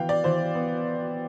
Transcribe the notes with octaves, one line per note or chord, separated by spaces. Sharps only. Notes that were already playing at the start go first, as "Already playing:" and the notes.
Already playing: E3 B3 F5 G5
D5
E3 C5
B3